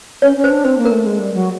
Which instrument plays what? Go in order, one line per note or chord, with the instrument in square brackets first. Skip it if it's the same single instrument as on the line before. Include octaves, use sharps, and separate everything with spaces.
[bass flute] C#4 [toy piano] C#5
[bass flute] C#4
[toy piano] C5
[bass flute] D4
[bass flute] C4 [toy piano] C5
[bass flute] A#3
[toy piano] A#4
[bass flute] A3
G#3
G3
F#3